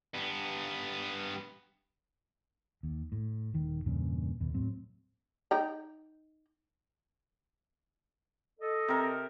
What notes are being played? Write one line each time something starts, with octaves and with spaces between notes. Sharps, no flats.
G2 B3
D#2
A2
D#1 D#3
E2 G2 A#2 C#3
D#2 B2
A2 F#3 C4
D#4 G5 A#5
A4 D#5
C3 A#4